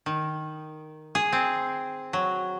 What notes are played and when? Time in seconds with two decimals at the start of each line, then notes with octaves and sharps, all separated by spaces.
0.06 D#3
1.15 G#4
1.33 C4
2.13 F#3